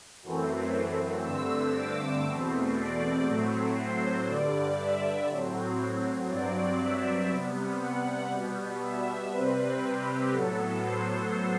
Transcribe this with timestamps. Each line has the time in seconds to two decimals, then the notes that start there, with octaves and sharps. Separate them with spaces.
0.22 F#2 E3 A3 C4
1.24 G2 D3 A3 C4 E6
1.74 D6
2.25 E2 B2 A3 C4
2.76 D5
3.26 A2 F#3 A3 C4
3.76 C5
4.26 G2 D3 G3 D5
4.77 E5
5.27 A2 F#3 C4
6.28 G2 F#3 C4 D5
6.78 E5
7.29 C3 G3 B3
7.79 F#5
8.30 B2 G3 B3
8.80 E5
9.30 C3 G3 C4 B4
9.81 G4
10.31 A2 F#3 B3 A4
10.82 C5